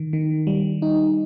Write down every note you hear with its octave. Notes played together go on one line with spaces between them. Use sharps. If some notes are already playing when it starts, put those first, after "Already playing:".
Already playing: D#3
D#3
G3
D#4